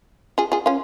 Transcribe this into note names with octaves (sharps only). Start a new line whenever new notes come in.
F4 G#4
F4 G#4
C#4 F4